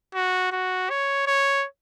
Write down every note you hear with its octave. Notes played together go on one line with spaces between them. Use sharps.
F#4
F#4
C#5
C#5